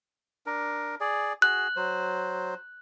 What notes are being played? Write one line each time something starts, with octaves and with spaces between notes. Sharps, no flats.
D4 A#4
G#4 D5
F#4 G#4 F#6
F#3 C5